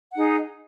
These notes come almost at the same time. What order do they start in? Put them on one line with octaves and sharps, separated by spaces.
F#5 D#4 G#4